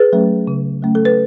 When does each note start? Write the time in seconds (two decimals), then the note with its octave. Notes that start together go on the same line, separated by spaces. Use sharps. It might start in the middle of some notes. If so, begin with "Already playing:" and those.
Already playing: G#4 B4
0.13 F#3 A3 C#4
0.47 C#3
0.82 F#3 A3 C#4
0.95 A4
1.05 B4